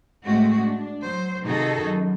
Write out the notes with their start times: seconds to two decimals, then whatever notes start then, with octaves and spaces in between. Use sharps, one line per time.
0.25 A2 G#3 A3 C4 F#4
0.63 D4
1.03 F#3 C5
1.45 C3 D#3 D#4 F#4 G#4 A4
1.82 F#2